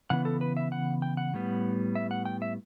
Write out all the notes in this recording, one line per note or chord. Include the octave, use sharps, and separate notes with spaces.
C#3 E3 B3 F#5
A4
B4
E5
F#5
G5
F#5
A2 G3 B3
E5
F#5
G5
E5